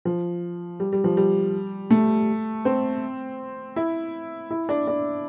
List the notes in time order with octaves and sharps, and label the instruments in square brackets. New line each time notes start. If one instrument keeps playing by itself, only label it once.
[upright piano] F3
G3
G3
F3
G3
A3
C4
E4
E4
D4
D4